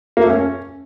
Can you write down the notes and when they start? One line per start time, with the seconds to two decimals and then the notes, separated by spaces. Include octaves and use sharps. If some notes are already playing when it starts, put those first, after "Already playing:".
0.17 A#3
0.24 A3
0.30 C#4